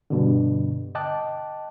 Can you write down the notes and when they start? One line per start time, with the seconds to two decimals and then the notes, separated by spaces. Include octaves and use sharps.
0.10 G2 B2 D3
0.95 D#5 G5 A5 D6 F#6